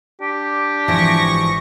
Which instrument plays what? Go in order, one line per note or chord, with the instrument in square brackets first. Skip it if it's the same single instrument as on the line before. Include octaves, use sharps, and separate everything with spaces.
[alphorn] D4 [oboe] G4
[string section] G#1 C#6 A#6 [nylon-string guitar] E3 F3